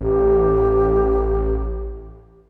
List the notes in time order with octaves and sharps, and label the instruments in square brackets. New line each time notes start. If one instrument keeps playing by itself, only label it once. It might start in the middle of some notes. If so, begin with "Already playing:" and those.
[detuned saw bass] A1 [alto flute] G4